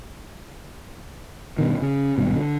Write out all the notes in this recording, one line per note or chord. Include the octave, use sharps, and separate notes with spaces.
G2 B2 D#3
C#3
D#1 G#1 G2 B2
D3